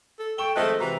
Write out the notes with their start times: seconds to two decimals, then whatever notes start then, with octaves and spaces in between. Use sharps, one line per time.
0.19 A4
0.38 A4 G5 C#6 E7 G7
0.56 D#3 F3 G#3 A3 C4 D#5 F#6
0.80 C3 E3 F#4 A#5